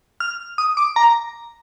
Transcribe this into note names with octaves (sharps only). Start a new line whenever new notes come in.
F6
D#6
D6
A#5